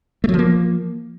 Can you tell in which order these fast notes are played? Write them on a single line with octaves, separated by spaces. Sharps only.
A3 F#3 F3 A#3